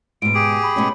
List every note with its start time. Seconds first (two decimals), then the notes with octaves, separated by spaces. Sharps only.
0.22 G#2 B2 D7
0.34 G4 G#4
0.63 B5
0.76 B2 G#3 C#4